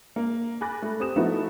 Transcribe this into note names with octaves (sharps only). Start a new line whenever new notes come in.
A#3
G#5 B5 D6 F#6 A6 A#6
A3
C4 G4 D#6 E7
F3 A3 B3 D#4 E4 F#4